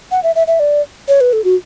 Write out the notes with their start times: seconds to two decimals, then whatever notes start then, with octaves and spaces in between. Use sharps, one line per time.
0.11 F#5
0.23 E5
0.35 E5
0.47 E5
0.60 D5
1.08 C#5
1.21 B4
1.33 A4
1.44 F#4